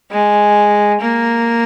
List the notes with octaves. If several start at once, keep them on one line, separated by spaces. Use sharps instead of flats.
G#3
A#3